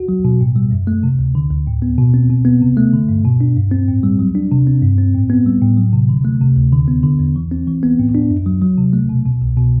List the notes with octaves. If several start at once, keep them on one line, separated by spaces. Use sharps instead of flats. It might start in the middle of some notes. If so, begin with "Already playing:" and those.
Already playing: F#4
F#3
B2
A2
G3
F#2
A3
C3
D2
D3
D2
A2
B3
B2
C4
B2
B3
C3
A3
D3
G2
B2
D4
G2
C4
A2
G3
F#3
D4
C3
C4
G2
C4
A2
B3
G3
A2
F#3
C3
D3
A3
C3
D2
D3
B3
D3
E2
E3
C4
E3
B3
A2
D4
F#2
F#3
F#3
C3
A3
B2
B2
C2
B2